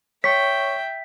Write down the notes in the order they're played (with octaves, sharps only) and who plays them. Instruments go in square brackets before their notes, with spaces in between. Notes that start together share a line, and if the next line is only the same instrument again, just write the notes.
[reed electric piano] C#5 C#6 [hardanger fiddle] E5 G5 [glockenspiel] B6